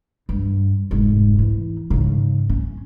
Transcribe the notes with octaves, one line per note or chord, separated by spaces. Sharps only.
G2
F1 G#2
E3
G#2 C#3
C#4